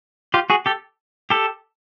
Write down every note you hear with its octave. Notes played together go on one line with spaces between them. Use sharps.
F4 G4
F#4 G#4
G4 A4
G4 A4